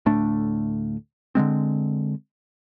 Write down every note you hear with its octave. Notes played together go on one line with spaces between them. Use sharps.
D2 A2 A3 D4
D3 E3 G#3 C4